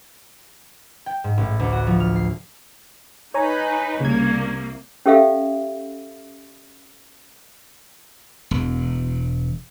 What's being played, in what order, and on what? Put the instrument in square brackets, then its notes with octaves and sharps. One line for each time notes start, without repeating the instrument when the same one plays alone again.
[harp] G5
G#2
A1
D2
F#4
F3
F6
C7
[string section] D#4 B4 [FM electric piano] C#5 G#5 A#5
[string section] C2 A#3 [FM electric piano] C#3 G#6
[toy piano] C#4 G4 A4 E5 F5
[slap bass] E1